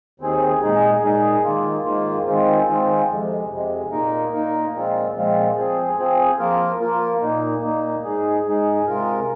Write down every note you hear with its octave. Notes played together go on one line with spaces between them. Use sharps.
D#2 D#3 C4 G#4
A#2 G#3 D#4 G#4
A#2 G#3 D#4 G#4
G#2 D#3 A#3 F4
G#2 D#3 A#3 F4
D#3 G#3 C4 F4
D#3 G#3 C4 F4
F2 C3 G#3
F2 C3 G#3
A#2 A#3 D#4 A#4
A#2 A#3 D#4 A#4
A#2 F3 G#3 C4 F4
A#2 F3 G#3 C4 F4
F3 C4 G#4
F3 C4 G#4
F3 A#3 F4 A#4
F3 A#3 F4 A#4
A#2 A#3 D#4
A#2 A#3 D#4
G#2 G#3 D#4 G#4
G#2 G#3 D#4 G#4
C3 G#3 F4 A#4